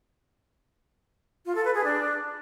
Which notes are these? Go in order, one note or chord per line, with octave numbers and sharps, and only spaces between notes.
F4
A4
B4
G#4
D4